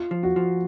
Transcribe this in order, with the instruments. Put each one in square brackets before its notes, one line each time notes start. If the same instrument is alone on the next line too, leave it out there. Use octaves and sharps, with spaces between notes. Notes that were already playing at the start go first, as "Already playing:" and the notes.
Already playing: [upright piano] F4
[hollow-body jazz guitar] F3
[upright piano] F#4
[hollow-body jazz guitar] F3